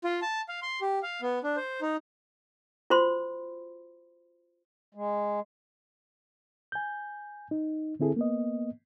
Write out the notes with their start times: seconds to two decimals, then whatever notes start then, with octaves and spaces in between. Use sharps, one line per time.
0.04 F4
0.22 A5
0.49 F5
0.62 C6
0.81 G4
1.03 F5
1.22 B3
1.44 D4
1.56 C5
1.82 D#4
2.90 F4 F#4 C5 B5 C6
4.95 G#3
6.72 G#5 G6
7.51 D#4
8.00 D3 C4 E4 G#4 A4
8.16 A#3 B3 D#5